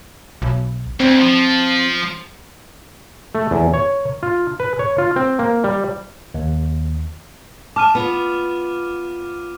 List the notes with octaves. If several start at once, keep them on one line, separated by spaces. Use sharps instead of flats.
B1
D2 C4
F3
A3
E2
C#5
F4
B4
C#5
F4
C4
A#3
G3
D#2
A5 D6 F6 D#7
B3 F4